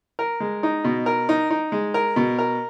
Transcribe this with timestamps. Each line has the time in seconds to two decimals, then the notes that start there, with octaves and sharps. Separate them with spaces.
0.19 A#4
0.40 G#3
0.63 D#4
0.84 B2
1.06 A#4
1.29 D#4
1.50 D#4
1.72 G#3
1.94 A#4
2.16 B2
2.38 A#4